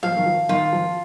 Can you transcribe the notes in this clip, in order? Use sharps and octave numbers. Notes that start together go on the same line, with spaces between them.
F3 F5
D#3
F3
D#3 F4
F3